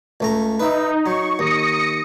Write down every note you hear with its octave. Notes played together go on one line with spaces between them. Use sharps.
C#2 A3 A#5
D#4 B4 E5
F#3 C#6
D#2 D#6 A#6 C#7